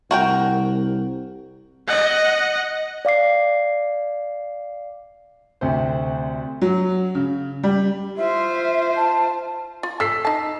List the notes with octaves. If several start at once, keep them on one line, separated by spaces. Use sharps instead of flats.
C2 F#4 A#4 G5
D#5 F#5
D5 F5 D6 C7
D2 C3 C5
F#3
C#3
G3
F4 C5 E5
A5
F4
A4 E6 B6 C7
D#4 A5